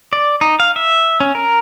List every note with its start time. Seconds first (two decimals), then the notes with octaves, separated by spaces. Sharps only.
0.13 D5
0.41 D#4
0.60 F5
0.76 E5
1.20 C#4
1.35 A#4